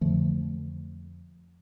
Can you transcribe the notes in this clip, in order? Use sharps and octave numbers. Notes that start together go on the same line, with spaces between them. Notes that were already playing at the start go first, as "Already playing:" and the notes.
F2 D3 F3 A3